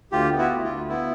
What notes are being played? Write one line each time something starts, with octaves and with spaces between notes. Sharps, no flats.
D2 F4 G4
B3
E4 F#4
D2
F4
D2
B3 E4